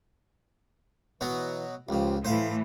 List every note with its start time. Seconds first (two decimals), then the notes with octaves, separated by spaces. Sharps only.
1.21 B2 E3 F#3 B3
1.89 C#2 C#3 F3 F4 G4
2.25 A2 E3 A3 C5 F5